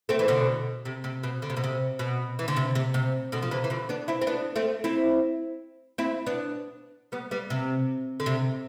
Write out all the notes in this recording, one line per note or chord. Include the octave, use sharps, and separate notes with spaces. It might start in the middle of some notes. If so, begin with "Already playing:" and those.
A3 C4
E3
B2 D3
C3
C3
B2
D3
C3
B2
C3
B2
E3
D3
C3
C3
C3
B2 D3
F3
C3 E3
E3
D3 F3
B3 D4
C4 E4
C4
B3 D4
A3 C4
C4 E4
C4 E4
B3 D4
G3 B3
G3 B3
C3
D3
C3